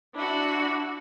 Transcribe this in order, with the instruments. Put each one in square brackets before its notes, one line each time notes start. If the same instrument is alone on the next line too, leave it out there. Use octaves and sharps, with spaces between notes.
[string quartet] D4 E4 F#4